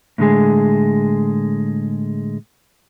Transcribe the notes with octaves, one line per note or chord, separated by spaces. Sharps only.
A2 D3 G#3 G#4